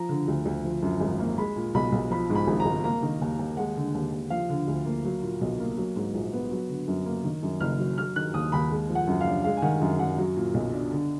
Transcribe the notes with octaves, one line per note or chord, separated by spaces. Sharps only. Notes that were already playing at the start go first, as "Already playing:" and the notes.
Already playing: F3 A#5
D3
D2
D2
F3
F#2
G#1
A#3
G#3 B5
A#2
B1 B5
B1
F3 B5
G#2
B5
G#1
A#5
G#1
A#3 A#5
D#3
D#2
D#2
G#3 F#5
D3
D#2
D#2
F3 F5
D3
D2
A#3
F#3
A#2
B1
A#3
F#3
G#2
A#1
B3
F#3
D3
F#2
A#3
D#3
F#2
F#1 F6
F#3
F#3 F6
D#3 F#6
D#2 D#6
D#2 B5
G#3
F3
F#5
F#2
F5
D4
G#3 F5
G#5
D#3 F#5
F#2
F#2 F#5
F#3
A#2
B1
D4
D3